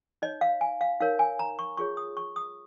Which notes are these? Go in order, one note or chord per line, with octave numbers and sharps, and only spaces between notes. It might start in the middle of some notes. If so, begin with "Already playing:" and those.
D#4 C#5 D#5
F5
G#5
F5
D#4 A#4 C#5 F5
G#5
A#5
C#6
F4 G#4 C#5 C#6
D#6
C#6
D#6